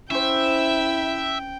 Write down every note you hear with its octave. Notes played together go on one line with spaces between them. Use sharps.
C#4 E4 C5 E5 G5